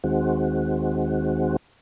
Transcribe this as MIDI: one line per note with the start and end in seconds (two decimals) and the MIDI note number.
0.04 1.56 39
0.04 1.56 51
0.04 1.56 56
0.04 1.56 60
0.04 1.56 66